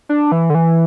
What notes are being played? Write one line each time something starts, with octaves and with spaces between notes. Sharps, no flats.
D4
E3
D3
E3